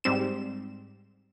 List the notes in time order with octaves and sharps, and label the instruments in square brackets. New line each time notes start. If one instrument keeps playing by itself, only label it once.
[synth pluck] G#2 G3 C4 E7